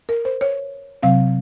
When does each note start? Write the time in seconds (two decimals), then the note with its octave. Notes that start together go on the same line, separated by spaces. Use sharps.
0.09 A#4
0.25 C5
0.41 C#5
1.03 C3 F#3 C4 F5